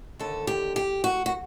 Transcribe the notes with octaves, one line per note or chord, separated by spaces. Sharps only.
D#2 D3 A4
G4
G4
F#4
F#4